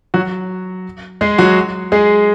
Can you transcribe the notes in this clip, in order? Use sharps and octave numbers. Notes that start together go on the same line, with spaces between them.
F#3 F#4
G#3 G#4
F#3 F#4
G#3 G#4